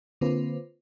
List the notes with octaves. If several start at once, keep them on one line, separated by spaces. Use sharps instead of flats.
D3 A#3 C4 F4 B4 C5